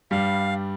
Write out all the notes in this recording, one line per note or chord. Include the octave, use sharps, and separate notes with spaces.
G2 G3 F5